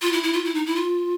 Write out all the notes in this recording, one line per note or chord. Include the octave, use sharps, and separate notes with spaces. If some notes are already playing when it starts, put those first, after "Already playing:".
F4
E4
E4
F4
E4
D#4
E4
F4